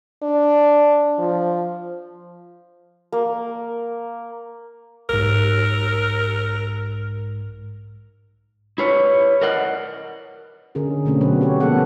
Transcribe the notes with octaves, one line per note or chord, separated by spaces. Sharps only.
D4
F3
A#3
B1 G#2 A#4
E4 B4 C#5
A#4 D5 D#5 F#5
D3 C#4 G#4 A#4
B2 D3 A3 C4 C#4
F#3 B3 B4
G4 C#5
F3 A#3 B3 G#4 A4 F#5